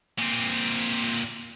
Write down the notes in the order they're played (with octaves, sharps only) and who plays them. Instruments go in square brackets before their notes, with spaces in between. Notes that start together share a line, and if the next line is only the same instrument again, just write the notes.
[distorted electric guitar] A#2 C4